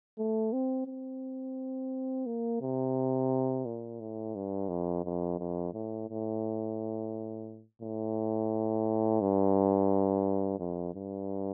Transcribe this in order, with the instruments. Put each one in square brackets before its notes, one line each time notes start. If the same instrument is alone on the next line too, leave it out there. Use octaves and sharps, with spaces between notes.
[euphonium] A3
C4
C4
A#3
C3
A#2
A2
G2
F2
F2
F2
A2
A2
A2
G2
F2
G2